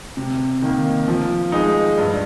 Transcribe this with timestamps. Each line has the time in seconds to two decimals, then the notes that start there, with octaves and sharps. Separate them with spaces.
0.17 C3
0.62 D#3 A#3
1.08 F3
1.52 G#3 D#4
1.98 G2